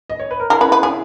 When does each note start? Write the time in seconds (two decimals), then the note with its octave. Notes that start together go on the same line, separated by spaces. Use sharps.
0.10 D#5
0.19 C#5
0.31 B4
0.40 A#4
0.50 E4 G#4 A#4
0.61 C#4 E4 B4
0.72 B4
0.83 C#4 E4 G#4